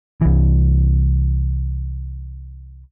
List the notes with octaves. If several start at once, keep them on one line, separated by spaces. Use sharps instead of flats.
C2 E3